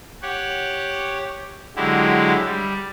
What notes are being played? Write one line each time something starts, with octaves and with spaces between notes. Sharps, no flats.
G4 C#5 F#5
D3 F#3 G#3 E4 G4
G3